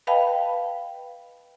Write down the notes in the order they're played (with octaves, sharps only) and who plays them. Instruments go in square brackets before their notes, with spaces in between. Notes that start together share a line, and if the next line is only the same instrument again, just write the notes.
[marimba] B4 D#5 F5 G5 A5 B5